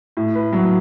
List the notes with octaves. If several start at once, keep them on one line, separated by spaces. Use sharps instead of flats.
A2
B4
F#3